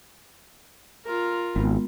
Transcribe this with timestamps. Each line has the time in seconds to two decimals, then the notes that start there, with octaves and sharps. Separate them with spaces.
1.05 F4 A#4
1.56 G#1 G#3 B3